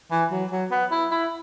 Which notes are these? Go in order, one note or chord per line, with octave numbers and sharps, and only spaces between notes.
E3
F#3
F#3
B3
E4
E4